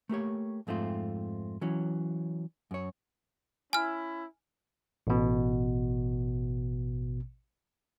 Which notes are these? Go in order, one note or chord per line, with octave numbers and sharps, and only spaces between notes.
A3 A#3 G4 C#5
F2 G#2 A3 C4 F4
E3 F#3 C#4
F#2 C#5
C#4 E4 G#5 F6
A1 B2